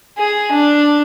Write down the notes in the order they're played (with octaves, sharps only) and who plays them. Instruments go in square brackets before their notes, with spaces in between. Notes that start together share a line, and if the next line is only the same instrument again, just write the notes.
[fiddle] G#4
D4